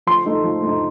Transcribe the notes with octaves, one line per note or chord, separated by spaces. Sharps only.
F3 C6
A3 D#4
F3
A3 D#4